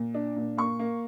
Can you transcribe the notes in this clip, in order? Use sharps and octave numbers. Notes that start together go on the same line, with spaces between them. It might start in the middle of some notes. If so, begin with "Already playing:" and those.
Already playing: A#2
D4
A#2
A#3 C#6
A#3